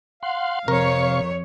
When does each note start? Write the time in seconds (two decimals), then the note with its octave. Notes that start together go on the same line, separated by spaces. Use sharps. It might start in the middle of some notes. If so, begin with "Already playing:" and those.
0.23 F5 F#5 C6
0.68 F2 C3 A#4 C#5 C#6